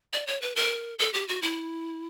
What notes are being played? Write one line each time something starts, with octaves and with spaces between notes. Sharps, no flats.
D5
C#5
B4
A#4
A4
G4
F#4
E4